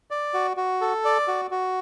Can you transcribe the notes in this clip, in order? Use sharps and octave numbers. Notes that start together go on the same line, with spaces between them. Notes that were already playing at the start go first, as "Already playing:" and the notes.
D5
F#4
F#4
A4
D5
F#4
F#4